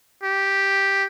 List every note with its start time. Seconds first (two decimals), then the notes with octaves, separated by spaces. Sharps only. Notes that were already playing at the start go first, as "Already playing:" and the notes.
0.23 G4